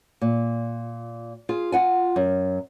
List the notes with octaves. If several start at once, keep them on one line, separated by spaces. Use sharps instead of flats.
A#2
F4 G#4
F4 F#5 G#5
F#2